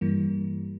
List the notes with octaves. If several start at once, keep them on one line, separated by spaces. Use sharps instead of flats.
G2 E3 G3 A#3